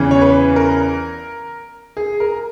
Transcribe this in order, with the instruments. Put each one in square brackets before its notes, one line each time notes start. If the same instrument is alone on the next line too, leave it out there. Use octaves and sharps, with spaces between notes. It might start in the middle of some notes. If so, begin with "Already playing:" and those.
Already playing: [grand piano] E2 C#3 E3
C#5
B4
A#4
G#4
A#4